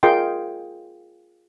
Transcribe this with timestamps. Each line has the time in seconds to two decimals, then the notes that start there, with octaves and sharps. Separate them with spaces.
0.03 F4 G#4 A#4 D#5 G5 C6